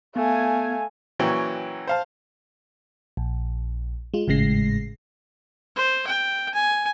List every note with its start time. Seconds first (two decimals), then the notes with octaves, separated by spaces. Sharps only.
0.16 A3 B3 F5 G#5
1.19 A#2 E3 F#3 C#4 G5 C#6
1.87 C5 F5 A5
3.17 A#1
4.14 G#3 F4
4.28 G#1 A2 C#3 G#3 A#6 C7
5.76 C5
6.07 G5
6.54 G#5